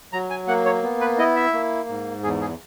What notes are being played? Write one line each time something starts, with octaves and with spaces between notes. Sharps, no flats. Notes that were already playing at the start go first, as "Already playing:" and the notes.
F#3 A#5
G#5
A#3 F#5
C#5
B3
B4
E4 D#5
E5
A#3
G#2
E2 G#4
G#4